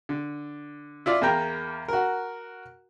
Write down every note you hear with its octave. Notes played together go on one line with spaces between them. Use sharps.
D3
E4 F4 D5
E2 A#3 G5 A#5
F#4 A#4